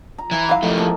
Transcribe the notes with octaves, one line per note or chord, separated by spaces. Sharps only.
A#5
E3
F#3 E4 F5
D#3 F3 A3
G#3 A#3 A4